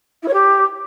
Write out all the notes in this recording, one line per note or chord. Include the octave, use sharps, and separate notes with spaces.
E4
C#5
G4